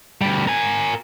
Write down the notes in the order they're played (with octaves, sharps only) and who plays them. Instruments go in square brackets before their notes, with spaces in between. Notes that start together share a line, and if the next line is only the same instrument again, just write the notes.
[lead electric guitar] D2 G3
A#4 G#5